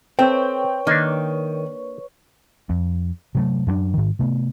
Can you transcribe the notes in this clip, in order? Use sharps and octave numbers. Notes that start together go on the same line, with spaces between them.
C4 A4 B4 C#5 E5 G5 C#6
D#3 A#3 D4
F2
C3 F#3 A3
F#2 F#3 G3 D4
G#2 D#3
C3 A3 B3